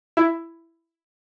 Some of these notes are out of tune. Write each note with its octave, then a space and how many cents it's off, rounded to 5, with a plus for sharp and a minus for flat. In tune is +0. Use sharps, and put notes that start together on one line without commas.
E4 +10